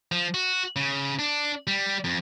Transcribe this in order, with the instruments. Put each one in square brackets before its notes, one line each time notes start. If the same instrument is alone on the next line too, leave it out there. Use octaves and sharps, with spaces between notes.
[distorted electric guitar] F3
F#4
C#3
D4
G3
F2